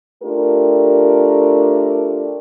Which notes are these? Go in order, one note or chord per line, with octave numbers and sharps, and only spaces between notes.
A3 D4 F4 G4 A#4